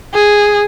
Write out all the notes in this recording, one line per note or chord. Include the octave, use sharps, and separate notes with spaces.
G#4